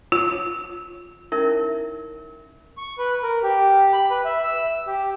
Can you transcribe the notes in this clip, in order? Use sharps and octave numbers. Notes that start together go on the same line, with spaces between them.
F4
C#4 D#4 E4 A#4 C#5 E5
C#6
B4
A#4
G4
B5
B4
E5
E6
G4